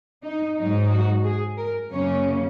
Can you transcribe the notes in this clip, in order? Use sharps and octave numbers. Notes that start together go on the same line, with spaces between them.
D#4
G#2 F#3 D#4
F#4
G#4
A#4
F#2 C#3 F#3 A#3 C#4 C#5